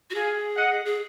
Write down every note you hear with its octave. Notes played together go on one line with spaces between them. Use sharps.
F#4
G#4 F5 G#5
D#5 F#5
G#4